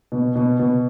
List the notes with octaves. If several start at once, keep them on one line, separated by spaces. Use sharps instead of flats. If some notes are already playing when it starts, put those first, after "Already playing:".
B2
B2
B2